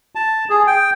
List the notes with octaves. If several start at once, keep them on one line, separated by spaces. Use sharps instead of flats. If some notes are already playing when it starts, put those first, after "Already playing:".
A5
G#4
G5